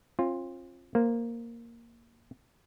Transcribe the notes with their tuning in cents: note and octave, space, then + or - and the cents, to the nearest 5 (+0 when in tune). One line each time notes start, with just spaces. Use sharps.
C4 +45 F4 +0
A#3 +0 C5 -5